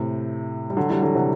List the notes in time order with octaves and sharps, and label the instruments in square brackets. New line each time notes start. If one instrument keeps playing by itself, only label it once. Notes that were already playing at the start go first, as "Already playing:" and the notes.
Already playing: [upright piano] A2 C3
G3
D3 F#3
E3 G3
D3 F#3
C3 E3